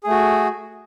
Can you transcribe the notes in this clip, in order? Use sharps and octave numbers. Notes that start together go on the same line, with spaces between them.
A3 F#4 G#4